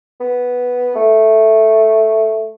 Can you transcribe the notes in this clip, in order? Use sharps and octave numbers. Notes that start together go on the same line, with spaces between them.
B3
A3